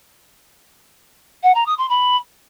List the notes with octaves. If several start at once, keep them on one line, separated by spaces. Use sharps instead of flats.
F#5
A#5
D#6
C6
B5